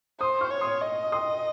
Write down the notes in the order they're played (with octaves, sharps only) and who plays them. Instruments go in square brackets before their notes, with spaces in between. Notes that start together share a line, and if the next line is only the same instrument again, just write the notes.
[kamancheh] C5 [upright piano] C6 D#6
[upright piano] C#6 F6
[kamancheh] C#5
[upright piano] C6 D#6
[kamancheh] D#5
[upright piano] C6 D#6